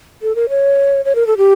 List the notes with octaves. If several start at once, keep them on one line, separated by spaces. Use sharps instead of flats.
A4
A#4
C#5
C#5
A#4
A4
G4